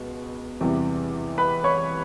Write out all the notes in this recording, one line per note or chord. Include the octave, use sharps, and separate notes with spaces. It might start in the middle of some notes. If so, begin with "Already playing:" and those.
Already playing: C#2 B2 B3
E2 C3 E3 G3
B4 B5
C#5 C#6